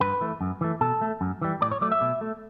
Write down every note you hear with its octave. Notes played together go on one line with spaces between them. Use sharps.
G2 B4
E3 A3
F#2
E3 A3
B2 A4
A3
F#2
E3 G3
A2 D5
C#5
F#3 A3 D5
E5
B2
A3